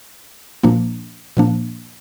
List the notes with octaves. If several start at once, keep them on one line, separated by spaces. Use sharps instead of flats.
A#2 F3 A#3 D4
A#2 F3 A#3 D4